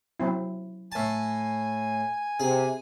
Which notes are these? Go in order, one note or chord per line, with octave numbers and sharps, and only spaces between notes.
F#3 C4 E4
A2 G#5 A5
C3 G#4